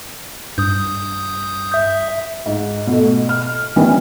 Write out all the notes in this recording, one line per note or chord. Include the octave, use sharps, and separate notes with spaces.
G2 D#6 G6
E5
G#2
B2 A3
F6
D#3 E3 G3 B3 C#4